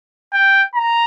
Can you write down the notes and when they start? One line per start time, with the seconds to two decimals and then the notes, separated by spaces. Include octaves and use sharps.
0.33 G5
0.75 A#5